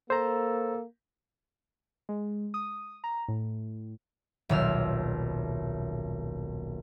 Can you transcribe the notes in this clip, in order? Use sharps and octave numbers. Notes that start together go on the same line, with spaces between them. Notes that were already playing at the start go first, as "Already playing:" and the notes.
A#3 A4 C5 A#5
G#3
D#6
A#5
A2
D#1 B1 E6 F6